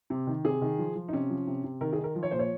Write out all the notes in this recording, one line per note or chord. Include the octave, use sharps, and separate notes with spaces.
C3
D#3
C3 G#4
D#3
F3
F3
D#4
C3 C#4
F3
C3
C3
D#3 A#4
G#4
D#3
A#4
F3
C#5
A#2 C5
C#5